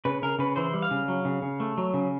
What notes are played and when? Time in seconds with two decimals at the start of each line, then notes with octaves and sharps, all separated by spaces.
0.05 C#3 B4
0.22 C#3 A#4
0.39 C#3 B4
0.56 E3 C5
0.74 G3
0.82 F5
0.91 C#3
1.08 F#3
1.25 C#3
1.42 C#3
1.60 A3
1.78 F#3
1.94 C#3